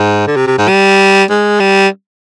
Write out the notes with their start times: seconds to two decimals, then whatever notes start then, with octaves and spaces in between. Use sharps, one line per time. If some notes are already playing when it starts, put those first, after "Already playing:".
Already playing: G#2
0.27 D3
0.37 C3
0.47 C3
0.58 G#2
0.68 G3
1.30 G#3
1.60 G3